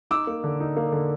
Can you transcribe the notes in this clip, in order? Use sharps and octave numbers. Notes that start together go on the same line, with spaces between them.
D#4 D6 E6
A#3
D3
D#4
A#3
D3